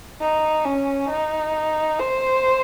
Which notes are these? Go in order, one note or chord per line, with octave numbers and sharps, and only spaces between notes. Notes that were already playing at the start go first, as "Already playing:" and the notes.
D#4
C#4
D#4
C5